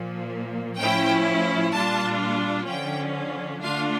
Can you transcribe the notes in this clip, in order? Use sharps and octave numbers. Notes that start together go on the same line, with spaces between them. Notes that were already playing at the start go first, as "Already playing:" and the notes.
Already playing: A#2 F3 A#3
A2 F3 C#4 E4 G5
A#2 G3 D4 F4 A5
D3 F3 C#4 G5
D3 A3 D4 F4 F5